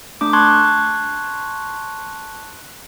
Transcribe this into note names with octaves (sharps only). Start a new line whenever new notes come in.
A3 D4 D6
A5 C6 C#6 F#6 G#6